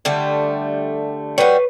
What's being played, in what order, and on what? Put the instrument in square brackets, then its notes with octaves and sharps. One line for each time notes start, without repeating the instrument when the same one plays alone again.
[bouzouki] D3 G3 A3
[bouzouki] G3 F#4 [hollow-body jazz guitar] B4 C#5